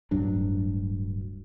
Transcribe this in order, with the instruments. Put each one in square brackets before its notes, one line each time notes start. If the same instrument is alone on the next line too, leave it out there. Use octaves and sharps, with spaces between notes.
[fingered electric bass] D1 G2 F#3 D4